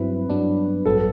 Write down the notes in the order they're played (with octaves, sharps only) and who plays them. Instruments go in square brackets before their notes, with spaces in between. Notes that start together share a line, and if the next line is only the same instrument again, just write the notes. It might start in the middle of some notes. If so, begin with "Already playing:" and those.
Already playing: [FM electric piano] G2 F#3 C4 E4 [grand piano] B4
[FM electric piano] G2 F#3 B3 D4
[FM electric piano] A1 G2 F#3 B3 [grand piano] A4